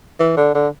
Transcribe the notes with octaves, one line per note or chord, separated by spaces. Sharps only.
E3
D3
D3